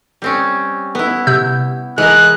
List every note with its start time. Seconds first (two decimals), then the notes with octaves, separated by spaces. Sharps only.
0.22 G3 C4 C#4
0.95 B3 E4
1.27 C3 E6 G6
1.98 E3 G#3 A#4 F#6